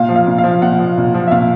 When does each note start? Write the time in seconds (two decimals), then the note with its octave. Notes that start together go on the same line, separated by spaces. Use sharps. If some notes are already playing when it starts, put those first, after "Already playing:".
Already playing: A#2 F5
0.09 F3
0.16 F5
0.27 A#2
0.38 F5
0.44 F3
0.62 A#2 F#5
0.79 F3
0.97 A#2
1.14 F3
1.27 E5
1.31 A#2 F5